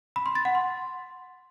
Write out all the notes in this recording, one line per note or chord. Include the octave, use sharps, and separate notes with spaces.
B5
C6
A6
F#5
C6